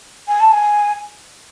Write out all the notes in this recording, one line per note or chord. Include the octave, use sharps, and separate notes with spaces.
G#5
A5
G#5